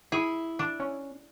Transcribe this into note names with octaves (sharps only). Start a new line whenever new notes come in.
E4 G#4
D4
C#4